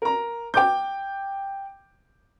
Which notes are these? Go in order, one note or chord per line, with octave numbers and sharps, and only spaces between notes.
A#4 A#5
G5 D6 G6